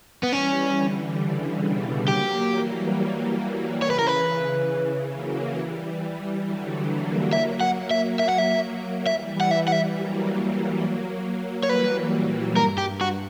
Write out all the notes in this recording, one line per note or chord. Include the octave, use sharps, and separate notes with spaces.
B3
E3 G3 C#4
D3
C#3
B2
F#3 A#3 G4
E3 G3
C#3 E3 C#5
B4
A#4
B4
C#3 E3
C#3 E3
F#3 A#3
E3 G3
D3 F#3
F#3 A#3
E5
F#5
E5
E5
F#5
E5
E3 G3 E5
F#5
E5
F#5
E5
F#3 A#3
C#5
E3 G3 B4
A#2
G2 A#4
G4
F#4